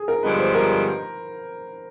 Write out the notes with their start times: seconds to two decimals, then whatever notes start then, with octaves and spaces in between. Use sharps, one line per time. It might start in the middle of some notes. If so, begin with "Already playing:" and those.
Already playing: G#4
0.08 A#4
0.23 G2 D3 F3 G#3 B3 B4
0.39 C5
0.55 A#4